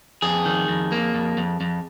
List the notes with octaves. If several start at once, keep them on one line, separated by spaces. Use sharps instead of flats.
F2 G#4
D#3
F2
A#3
F2
F2
F2